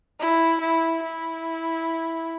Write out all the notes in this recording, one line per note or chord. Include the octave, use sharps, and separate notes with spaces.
E4
E4
E4